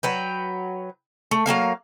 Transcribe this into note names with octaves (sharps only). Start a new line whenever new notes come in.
F#3 B4 G5
A3
F#3 G#3 A#3 F5